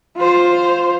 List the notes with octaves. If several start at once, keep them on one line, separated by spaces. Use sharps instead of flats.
F4 C5